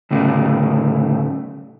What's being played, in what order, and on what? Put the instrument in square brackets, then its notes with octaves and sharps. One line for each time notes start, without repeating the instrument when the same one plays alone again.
[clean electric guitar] D2 A2 C#3 A3